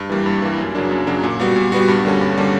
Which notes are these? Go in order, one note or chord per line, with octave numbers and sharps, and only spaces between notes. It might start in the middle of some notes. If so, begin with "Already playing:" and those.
Already playing: G2
E3 G3 A#3
G2
E3 G3 A#3
F#2
C#3 F#3 A#3 D4
F#2
C#3 F#3 A#3 D4
A#2
G3 B3 F#4
A#2
G3 B3 F#4
G2
D3 G3 A#3 C#4
G2
D3 G3 A#3 C#4